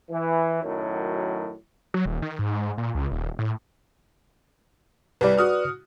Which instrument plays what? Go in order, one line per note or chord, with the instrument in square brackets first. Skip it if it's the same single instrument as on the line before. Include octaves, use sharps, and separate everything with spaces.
[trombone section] E3
F#2 A2 D#3 F#3
[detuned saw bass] F#3
D#1
D#3
G#2
A#2
C#2
D#1
A2
[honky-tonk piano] C2 G3 [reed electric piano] B4 D5
[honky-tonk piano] F#4 D#6 F6